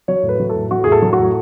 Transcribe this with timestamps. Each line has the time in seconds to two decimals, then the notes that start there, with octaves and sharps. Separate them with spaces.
0.08 F#3 C#5
0.23 A2
0.29 B4
0.40 F#3
0.49 A4
0.55 A2
0.71 F#3 F#4
0.84 A2 G#4
0.92 A4
1.02 F#3
1.13 F#4
1.19 A2